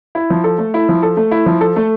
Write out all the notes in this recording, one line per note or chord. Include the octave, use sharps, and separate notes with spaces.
E4
F3
A4
A3
E4
F3
A4
A3
E4
F3
A4
A3